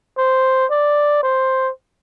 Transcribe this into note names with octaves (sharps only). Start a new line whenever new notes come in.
C5
D5
C5